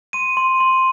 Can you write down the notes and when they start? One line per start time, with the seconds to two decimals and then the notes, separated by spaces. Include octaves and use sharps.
0.13 C6 D#7
0.37 C6
0.60 C6